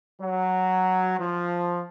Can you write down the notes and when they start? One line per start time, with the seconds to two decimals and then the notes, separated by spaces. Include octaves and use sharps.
0.22 F#3
1.19 F3